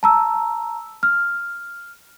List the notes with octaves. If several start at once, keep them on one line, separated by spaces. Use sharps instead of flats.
A5 A#5 E6
F6